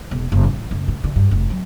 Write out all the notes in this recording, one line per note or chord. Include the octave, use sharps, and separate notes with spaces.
E1
F#1
A1
F#1
A2
D3
G2
F1
F#3